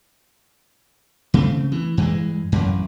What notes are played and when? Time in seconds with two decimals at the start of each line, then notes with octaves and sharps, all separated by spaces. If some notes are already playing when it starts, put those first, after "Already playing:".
1.34 C#3 A3 C4
1.72 E3
1.97 G2 E3 G#3
2.52 A1 F#2